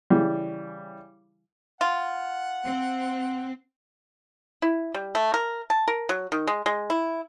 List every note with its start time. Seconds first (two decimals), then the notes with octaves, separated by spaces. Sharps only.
0.10 C#3 E3 G3
1.81 F4 F#5
2.64 C4
4.62 E4
4.94 G3
5.15 A3
5.34 A#4
5.70 A5
5.88 A#4
6.09 F#3
6.32 D#3
6.47 G#3
6.66 G#3
6.90 E4